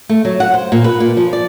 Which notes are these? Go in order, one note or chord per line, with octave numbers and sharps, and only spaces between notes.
A3
F#3
F#5
C5
A#2
B4
A#2
F3
D5